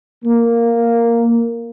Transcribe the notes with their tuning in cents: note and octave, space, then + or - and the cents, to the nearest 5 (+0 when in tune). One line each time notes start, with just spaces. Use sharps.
A#3 -5